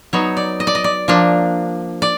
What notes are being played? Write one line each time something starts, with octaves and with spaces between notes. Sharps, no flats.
F#3 B3 D#4 C#5
D5
D#5
D5
D#5
D5
F3 A#3 D4
D5